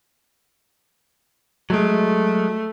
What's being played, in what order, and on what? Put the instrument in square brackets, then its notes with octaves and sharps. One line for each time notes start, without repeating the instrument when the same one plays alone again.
[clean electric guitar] F#3 G#3 [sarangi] A3